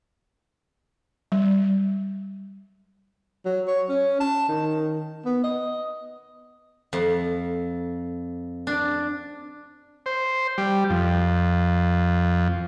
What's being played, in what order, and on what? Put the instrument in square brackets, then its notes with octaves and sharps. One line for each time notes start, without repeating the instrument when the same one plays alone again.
[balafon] G3
[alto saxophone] F#3
C#5
C#4
A5
D#3
B3
D#5
[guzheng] F2
D4
[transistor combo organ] C5
G3
F2